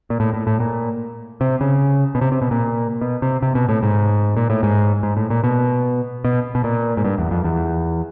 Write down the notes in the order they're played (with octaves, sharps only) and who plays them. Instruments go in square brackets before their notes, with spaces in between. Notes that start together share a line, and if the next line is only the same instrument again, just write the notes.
[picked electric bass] A#2
A2
A2
A2
A#2
C3
C#3
B2
C3
C3
B2
A#2
B2
C3
C3
B2
A2
G#2
A#2
A2
G#2
G#2
A2
A#2
B2
B2
B2
A#2
G#2
G2
E2
F2
E2